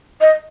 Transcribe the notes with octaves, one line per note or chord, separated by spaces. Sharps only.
D#5